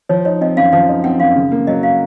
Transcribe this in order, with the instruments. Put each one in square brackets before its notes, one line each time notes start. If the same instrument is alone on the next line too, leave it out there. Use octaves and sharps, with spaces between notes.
[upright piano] F3 [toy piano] C#5
[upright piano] D#4 [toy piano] C#5
[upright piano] C4 [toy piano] D#5
[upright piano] F#2 [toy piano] F5
[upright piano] F3 [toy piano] F5
[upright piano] D#4
[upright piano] C4 [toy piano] F#5
[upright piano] F#2 [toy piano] F5
[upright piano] C#3
A#3
[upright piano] F#3 [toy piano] D#5
[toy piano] F5